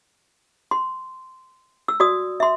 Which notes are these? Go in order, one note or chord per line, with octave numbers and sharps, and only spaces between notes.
C6
E6
F#4 D5 D#6
E5 C6